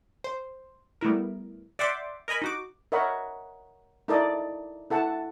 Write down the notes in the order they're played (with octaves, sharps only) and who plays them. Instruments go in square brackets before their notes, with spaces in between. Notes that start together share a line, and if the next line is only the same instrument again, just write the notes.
[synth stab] C5
G3 A3 B3 E4 A#4
D5 E5 F#5 G5 C6 D6
A#4 D#5 G#5 B5
D#4 F#4 D6
[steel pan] A#4 C#5 D#5 E5 F#5 B5
D#4 E4 A4 A#4 D5 D#5
E4 A4 F#5 A5